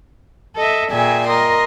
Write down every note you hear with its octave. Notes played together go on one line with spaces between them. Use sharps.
A4 D#5 E5
A#2 G#4 D5 E5 G5 G#5
A#4 D#5 C6